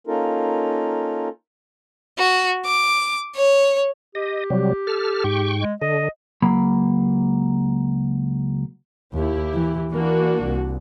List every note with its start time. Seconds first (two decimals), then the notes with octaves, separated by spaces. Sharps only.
0.07 A#3 C#4 D#4 F4 A4 A#4
2.18 F#4
2.65 D6
3.36 C#5
4.15 G4 D#5
4.50 C3 F#3 G3
4.87 A4 F6
5.24 G#2 G5 C#6
5.61 G#3
5.82 D3 D#5
6.42 C#2 F#3 A#3 B5
9.13 D#2 E4 G4
9.54 E3
9.92 E3 A#3 D4 F#4
10.43 C2